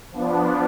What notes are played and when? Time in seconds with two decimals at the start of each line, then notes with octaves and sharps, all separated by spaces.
0.12 F3 B3 D4